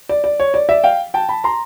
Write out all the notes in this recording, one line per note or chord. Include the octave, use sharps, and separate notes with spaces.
D5
D5
C#5
D5
D5 E5
F5 G5
G5 A5
A5 B5
A#5 C6